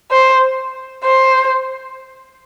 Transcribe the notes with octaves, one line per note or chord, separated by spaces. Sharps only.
C5
C5